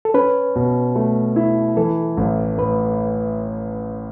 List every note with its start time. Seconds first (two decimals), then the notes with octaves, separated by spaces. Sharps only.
0.05 A4
0.14 C#4 B4
0.55 B2
0.96 A3
1.36 E4
1.77 E3 A4
2.17 A1
2.58 A2 B4